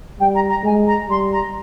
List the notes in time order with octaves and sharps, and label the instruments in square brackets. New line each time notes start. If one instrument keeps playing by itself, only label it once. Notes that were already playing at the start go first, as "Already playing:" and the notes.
[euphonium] G3 [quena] G5
[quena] A#5
A#5
[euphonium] G#3 [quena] G#5
[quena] A#5
[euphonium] G3 [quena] C6
[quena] A#5